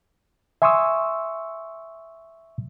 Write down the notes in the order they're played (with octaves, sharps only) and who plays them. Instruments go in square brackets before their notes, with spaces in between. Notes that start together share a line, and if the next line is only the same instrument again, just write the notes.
[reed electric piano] E5 G#5 C6 C#6 D#6 E6